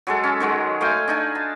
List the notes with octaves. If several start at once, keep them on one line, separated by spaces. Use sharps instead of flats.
F#3 G#3 A4
C#4
D#3 F#3 G#3
A3 F5 G5 G#5
D4 D#4 G#5
A5